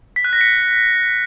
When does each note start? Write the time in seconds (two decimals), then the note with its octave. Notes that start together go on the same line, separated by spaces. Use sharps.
0.16 B6
0.24 F#6
0.33 A#6
0.41 C#7